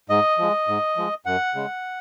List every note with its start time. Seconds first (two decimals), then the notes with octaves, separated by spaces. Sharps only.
0.10 G#2 D#5
0.38 F3 G#3
0.68 G#2
0.97 F3 G#3
1.26 F#2 F#5
1.55 C#3 G#3